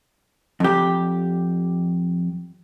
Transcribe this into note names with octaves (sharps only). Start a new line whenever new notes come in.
F2 G4